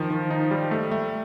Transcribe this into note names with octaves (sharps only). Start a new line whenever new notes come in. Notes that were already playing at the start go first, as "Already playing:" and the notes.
Already playing: D#3 F3
D#3
D#4
G3
A3
A3